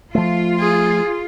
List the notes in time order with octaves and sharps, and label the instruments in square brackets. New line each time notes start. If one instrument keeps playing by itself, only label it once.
[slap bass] F3 A3 [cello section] F4
[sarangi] G#4